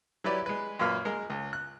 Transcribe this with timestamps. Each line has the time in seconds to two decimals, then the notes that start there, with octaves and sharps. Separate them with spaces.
0.24 F#3 E4 G4 B4 D5
0.46 G#3 B4
0.79 F#2 A#2 A#3 B4 F6
1.05 G#3 A#4
1.30 C#2
1.53 F#6